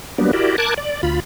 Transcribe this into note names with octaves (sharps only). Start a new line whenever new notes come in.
F#3 G3 A#3 B3 D4
E4 F#4 G4 A#4 D5
A#4 A5 D6 F#6 G#6
D5
D2 F4 B5